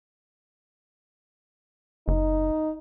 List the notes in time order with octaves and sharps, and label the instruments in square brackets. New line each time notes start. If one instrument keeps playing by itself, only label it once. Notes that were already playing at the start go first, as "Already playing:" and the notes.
[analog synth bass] F#1 [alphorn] D#4